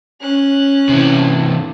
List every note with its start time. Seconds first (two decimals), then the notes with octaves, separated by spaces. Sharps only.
0.21 C#4 F#6
0.89 C3 E3